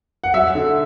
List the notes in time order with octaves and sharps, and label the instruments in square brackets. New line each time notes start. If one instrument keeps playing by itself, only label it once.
[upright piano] F#5
F#3 E5
D3